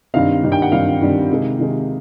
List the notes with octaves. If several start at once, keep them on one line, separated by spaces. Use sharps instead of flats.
G2 D#3 G3 C4 F5
G2 D#3 G3 C4
G5
F#5
G2 D#3 G3 C4 F5
G2 D#3 G3 C4
C3 D#3 G#3
C3 D#3 G#3